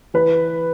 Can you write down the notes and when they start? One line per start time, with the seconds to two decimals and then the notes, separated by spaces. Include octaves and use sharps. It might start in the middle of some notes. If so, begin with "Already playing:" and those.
0.14 E3 B4